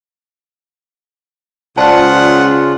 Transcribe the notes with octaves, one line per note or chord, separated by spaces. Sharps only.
C#2 C#3 F4 C5 D5 F#5 A5